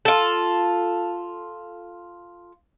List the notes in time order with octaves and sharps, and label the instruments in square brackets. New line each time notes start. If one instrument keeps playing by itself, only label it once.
[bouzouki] F4 A4